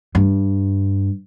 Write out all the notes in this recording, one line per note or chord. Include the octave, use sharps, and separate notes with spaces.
G2